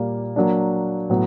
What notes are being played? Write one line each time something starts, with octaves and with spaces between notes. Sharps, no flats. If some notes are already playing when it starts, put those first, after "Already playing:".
Already playing: A#2 G3 A#3
F#3 A#3 D4
A2 F#3 B3